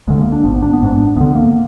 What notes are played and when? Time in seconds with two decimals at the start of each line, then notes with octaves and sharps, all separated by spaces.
0.08 D2 D3 G#3
0.21 A#3
0.32 D4
0.44 G#1 G#2 B3
0.62 D4
0.73 B3
0.81 G#1 G#2 D4
1.16 D2 D3 B3
1.35 A#3